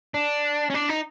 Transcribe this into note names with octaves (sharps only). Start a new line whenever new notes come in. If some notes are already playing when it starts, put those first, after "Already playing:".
D4
C#4
D4
D#4